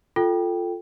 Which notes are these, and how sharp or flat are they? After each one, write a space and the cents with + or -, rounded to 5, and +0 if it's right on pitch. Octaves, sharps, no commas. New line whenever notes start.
F4 +0 A4 +0 G5 +0